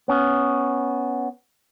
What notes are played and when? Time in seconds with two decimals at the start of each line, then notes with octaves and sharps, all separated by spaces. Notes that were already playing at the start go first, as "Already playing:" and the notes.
0.08 B3 C#4